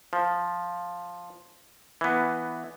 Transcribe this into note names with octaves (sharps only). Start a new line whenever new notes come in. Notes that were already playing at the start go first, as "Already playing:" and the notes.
F3
E3 B3